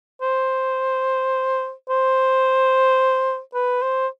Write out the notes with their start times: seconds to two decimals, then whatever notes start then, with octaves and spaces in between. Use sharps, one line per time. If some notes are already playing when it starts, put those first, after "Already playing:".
0.21 C5
1.89 C5
3.54 B4
3.82 C5